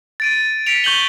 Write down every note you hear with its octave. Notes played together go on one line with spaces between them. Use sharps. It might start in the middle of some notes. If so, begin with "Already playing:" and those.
A6 D7 D#7
B6 C#7 D7 F7
C#6 G6 F#7 G7